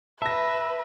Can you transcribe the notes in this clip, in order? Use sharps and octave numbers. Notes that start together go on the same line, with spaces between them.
B4 E5 A5 A#6